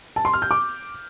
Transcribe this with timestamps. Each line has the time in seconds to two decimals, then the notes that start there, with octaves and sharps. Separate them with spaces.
0.16 A5
0.25 C6
0.33 F6
0.42 G6
0.51 D6